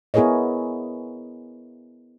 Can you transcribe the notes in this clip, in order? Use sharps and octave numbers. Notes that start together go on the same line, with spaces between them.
B3 E4 G#4 A#4 C#5 D#5